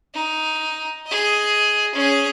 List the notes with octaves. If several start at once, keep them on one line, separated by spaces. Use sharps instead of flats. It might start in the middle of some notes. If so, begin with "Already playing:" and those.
D#4
G#4 D#5
C#4 G#4